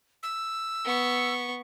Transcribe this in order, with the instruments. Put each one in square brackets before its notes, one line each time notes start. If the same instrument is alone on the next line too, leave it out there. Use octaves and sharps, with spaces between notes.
[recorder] E6
[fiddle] B3 C#6